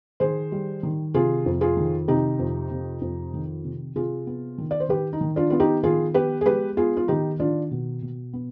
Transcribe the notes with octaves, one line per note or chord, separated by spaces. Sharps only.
D#3 G#4 C5
G3
D#3
C3 F4 G#4
F2
F4 G#4
D#3
C3 D#4 G4
F2
C3
F2
D#3
C3
C3 F4 G#4
B3
D#3
D5
C5
D#3 G4 B4
D#4
D#3
D4 F4
B3 F4
D#4 G4
D#3 F4 G#4
B3 G4 B4
G#4
G#3 G4 B4
B3 F4 G#4
F4
D#3 D#4 G4
D#3 D4 F4
B2
B2
B3